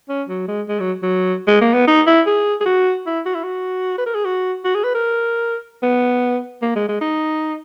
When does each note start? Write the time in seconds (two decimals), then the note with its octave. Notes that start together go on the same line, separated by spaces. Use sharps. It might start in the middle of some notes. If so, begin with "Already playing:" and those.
0.09 C#4
0.29 F#3
0.48 G#3
0.69 G#3
0.80 F#3
1.03 F#3
1.48 G#3
1.61 A#3
1.74 B3
1.88 D#4
2.07 E4
2.27 G#4
2.61 G#4
2.66 F#4
3.07 E4
3.26 F#4
3.35 E4
3.44 F#4
3.98 B4
4.06 A#4
4.15 G#4
4.25 F#4
4.65 F#4
4.75 G#4
4.84 B4
4.95 A#4
5.83 B3
6.62 A#3
6.76 G#3
6.89 G#3
7.01 D#4